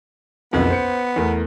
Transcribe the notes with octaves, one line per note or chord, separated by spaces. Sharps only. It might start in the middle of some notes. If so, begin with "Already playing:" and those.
F#1 B1 F2 B3
C5 C#7
E2 A3 A#4